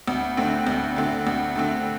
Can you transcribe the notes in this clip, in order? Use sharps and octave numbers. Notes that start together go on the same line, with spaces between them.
D2
D3 A3 C4
D2
D3 A3 C4
D2
D3 A3 C4